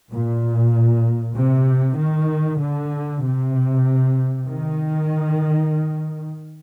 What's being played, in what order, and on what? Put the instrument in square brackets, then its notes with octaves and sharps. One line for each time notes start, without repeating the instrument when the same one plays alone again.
[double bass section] A#2
C3
D#3
D3
C3
D#3